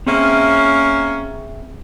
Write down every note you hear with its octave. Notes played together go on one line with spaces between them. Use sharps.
A#3 C4 C#4 G#4 E5